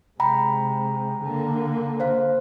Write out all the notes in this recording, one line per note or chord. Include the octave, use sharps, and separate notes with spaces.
C3 G#3 G5 A#5 B5
D3 A#3
C5 F5